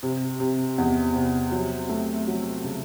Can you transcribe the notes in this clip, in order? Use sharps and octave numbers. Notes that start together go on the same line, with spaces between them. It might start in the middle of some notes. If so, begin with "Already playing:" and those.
C3
C3
E2
C3
F#3
A3
F#3
C#3